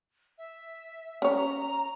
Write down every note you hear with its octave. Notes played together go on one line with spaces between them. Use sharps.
E5
C#4 C#5 A#5